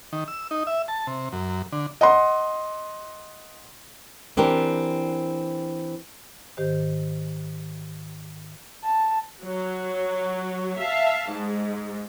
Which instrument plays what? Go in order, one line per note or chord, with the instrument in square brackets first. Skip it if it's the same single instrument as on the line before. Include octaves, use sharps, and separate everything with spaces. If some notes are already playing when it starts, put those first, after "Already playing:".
[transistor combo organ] D#3
E6
D#4
E5
A5
C3
F#2
D3
[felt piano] D#5 F#5 C6
[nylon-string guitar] E3 C4 D4 G4 A#4
[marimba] G#2 D#3 G4 C5
[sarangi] A5
[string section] F#3
E5 F5 A5
G#2 G#3